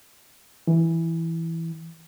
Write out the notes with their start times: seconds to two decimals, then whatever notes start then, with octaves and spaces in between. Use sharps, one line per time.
0.67 E3